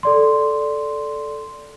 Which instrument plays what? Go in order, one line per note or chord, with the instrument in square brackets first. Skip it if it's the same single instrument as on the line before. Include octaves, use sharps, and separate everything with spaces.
[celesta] A4 D5 C6